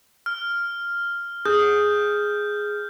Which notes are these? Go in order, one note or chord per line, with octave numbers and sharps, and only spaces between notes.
F6
G#4 G6